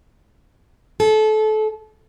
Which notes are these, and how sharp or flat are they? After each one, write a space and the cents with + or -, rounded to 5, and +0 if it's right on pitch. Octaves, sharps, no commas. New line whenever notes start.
A4 -30